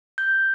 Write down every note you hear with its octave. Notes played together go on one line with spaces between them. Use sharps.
G6